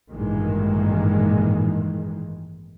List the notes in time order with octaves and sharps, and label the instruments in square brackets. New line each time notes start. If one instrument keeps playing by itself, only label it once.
[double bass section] A1 G2 A#2 D#3 E3 G#3